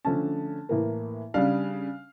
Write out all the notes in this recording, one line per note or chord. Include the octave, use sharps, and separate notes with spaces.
D3 F3 A3 C#4 A5
A2 E3 A#3
C#3 G3 D4 F5